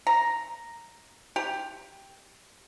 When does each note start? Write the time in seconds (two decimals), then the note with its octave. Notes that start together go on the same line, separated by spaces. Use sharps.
0.07 A#5
1.36 G4